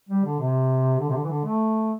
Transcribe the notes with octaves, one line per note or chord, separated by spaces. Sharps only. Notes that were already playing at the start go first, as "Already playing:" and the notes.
G3
D3
C3
D3
C3
D3
E3
D3
A3